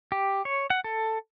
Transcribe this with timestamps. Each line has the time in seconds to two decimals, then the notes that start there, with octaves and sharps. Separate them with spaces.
0.12 G4
0.45 C#5
0.70 F#5
0.84 A4